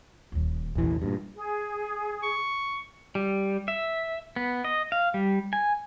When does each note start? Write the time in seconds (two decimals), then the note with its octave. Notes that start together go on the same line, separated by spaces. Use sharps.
0.32 D#1 D#2
0.75 A#1 E2 C3 E3
1.02 G2 A#2
1.35 G#4
2.23 C#6
3.15 G3
3.68 E5
4.36 B3
4.64 D#5
4.92 F5
5.14 G3
5.53 G#5